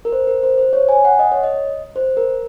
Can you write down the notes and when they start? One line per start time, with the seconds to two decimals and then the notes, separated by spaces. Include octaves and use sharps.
0.05 A#4
0.12 C5
0.27 A#4
0.43 C5
0.58 C5
0.73 C#5
0.89 G#5
1.05 F#5
1.19 D#5
1.32 C#5
1.43 D#5
1.96 C5
2.17 A#4